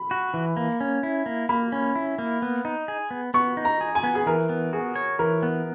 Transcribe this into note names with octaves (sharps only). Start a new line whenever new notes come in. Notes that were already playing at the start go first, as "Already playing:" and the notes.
Already playing: B5
F#4
E3
A#3
C#4
E4
A#3
A#3 B5
C#4
E4
A#3
B3
D#4
G#4
B3
B3 C#6
D#4
A#5
G#4
G#5
B3
G#4
E3 A#4
B3
F#4 G#4
C#5
E3 A#4
B3